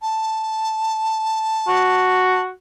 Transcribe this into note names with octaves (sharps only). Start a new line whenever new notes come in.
A5
F#4